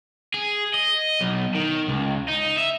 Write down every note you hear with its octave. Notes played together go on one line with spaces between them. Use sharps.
G#4
D#5
B1
D#3
C#2
D#4
E5